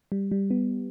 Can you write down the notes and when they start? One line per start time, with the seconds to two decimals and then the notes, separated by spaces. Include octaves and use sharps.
0.12 G3
0.31 G3
0.51 B3